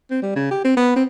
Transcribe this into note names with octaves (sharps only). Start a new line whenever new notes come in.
C4
G3
C#3
G4
C4
B3
C4